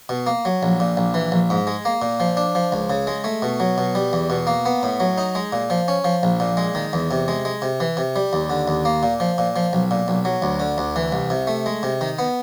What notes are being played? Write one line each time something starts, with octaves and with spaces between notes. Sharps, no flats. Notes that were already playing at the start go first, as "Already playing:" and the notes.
B2
A#3
F#3
A#1
A#2
A#1
E3
A#1
G#2
G#3
A#3
A#2
F3
D4
F3
C#2
C#3
G#3
A3
B2
F#3
B2
G3
E2
B2
A#3
B3
A2
F#3
D#4
G#3
A#2
F3
C#4
F3
A#1
A#2
G#3
D#3
E2
C3
G#3
G#3
C3
E3
C3
G3
D#2
D3
D#2
A#3
A#2
F3
A#2
F3
B1
A#2
B1
F#3
D2
D3
D2
E3
C2
C3
A3
G#3
C3
D#3
B3